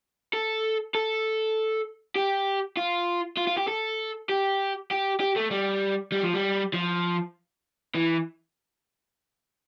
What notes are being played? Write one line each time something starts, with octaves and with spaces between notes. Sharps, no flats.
A4
A4
G4
F4
F4
F4
G4
A4
G4
G4
G4
A3
G3
G3
F3
G3
F3
E3